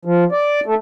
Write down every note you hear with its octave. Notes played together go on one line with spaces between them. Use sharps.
F3
D5
A3